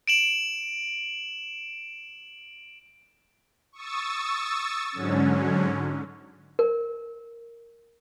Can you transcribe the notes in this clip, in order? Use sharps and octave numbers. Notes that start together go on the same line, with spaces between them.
D7 E7 F#7
C#6 D#6 E6 A6
G#2 D3 F#3 C#4
A#4